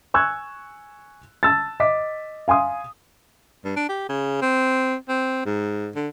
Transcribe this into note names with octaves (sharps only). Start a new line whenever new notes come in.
G#5 C#6 E6 F#6 G#6
A5 E6 A6
D#5 D6 B6
F5 G#5 C6 D#6
G2
D4
G4
C#3
C4
C4
G#2
D3